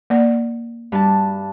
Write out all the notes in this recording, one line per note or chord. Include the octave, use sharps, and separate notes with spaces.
A#3 D5
G2 A5